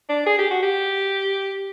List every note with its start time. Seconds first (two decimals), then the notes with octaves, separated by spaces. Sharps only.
0.09 D4
0.27 G#4
0.38 G4
0.51 F#4
0.63 G4